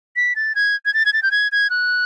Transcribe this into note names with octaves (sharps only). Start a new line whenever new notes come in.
B6
A6
G#6
G#6
A6
G#6
A6
G6
G#6
G#6
F#6